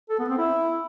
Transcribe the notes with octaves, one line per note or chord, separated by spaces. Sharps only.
A4
B3
C4
E4